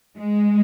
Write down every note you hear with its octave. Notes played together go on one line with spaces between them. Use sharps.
G#3